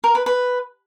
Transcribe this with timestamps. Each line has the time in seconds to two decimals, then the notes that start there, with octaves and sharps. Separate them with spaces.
0.04 A#4
0.15 B4
0.26 B4